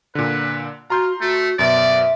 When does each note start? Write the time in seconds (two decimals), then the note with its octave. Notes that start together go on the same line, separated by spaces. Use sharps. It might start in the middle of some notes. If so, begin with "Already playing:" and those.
0.15 A#2 D3 B4
0.90 F4 F#4 A#5 C6 G6
1.21 A3 F#4
1.59 F#2 B2 D5 E5